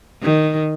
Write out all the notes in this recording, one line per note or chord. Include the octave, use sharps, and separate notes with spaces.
D#3